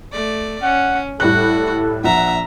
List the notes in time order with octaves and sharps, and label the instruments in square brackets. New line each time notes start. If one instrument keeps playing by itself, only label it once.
[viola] A3 D5
[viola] C#4 [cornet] F#5
[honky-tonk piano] A2 G3 F#6 [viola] F#4 [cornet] A4
[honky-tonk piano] A#1 [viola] E5 A#5 [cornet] F#5